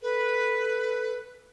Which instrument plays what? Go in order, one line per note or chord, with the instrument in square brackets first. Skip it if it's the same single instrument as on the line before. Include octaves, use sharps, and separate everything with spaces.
[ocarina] A4 [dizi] B4